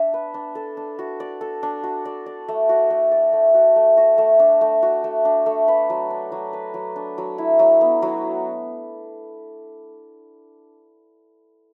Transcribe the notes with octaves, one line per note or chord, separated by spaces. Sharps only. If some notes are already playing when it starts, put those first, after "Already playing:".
Already playing: D4 E5
B4
D4
A4
D4
F#4
D5
A4
D4
F#4
D5
D5
A3
F#4
A3
D5
A3
F#4
A3
F#4
A3
D4
A3
F#4
A3
D4
A3
B4
F#3
D4
F#3
B4
F#3
D4
F#3
E4
F#3
B3
F#3